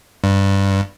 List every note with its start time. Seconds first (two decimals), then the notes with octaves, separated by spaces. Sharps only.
0.24 G2